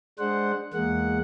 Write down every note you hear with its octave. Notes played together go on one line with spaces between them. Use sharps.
G#3 D4 C5 F#5
E2 G#3 A#3 F#5